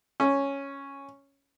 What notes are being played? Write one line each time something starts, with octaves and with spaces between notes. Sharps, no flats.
C#4